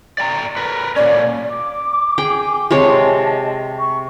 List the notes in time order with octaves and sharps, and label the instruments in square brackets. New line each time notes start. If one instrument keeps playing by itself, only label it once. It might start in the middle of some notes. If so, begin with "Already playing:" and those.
[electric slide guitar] D5 G5 A#5
A#4 B4
[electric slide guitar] A#2 C#4 [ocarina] D5
[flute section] D6
[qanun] G#4 G5
[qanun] C3 G#3 C#5 [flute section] D#5 A5
[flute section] C#6